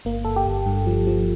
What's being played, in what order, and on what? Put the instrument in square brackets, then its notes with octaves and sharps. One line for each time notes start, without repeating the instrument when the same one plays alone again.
[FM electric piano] G1 A#3
G1 A4
G4
G1
G2
F3
F3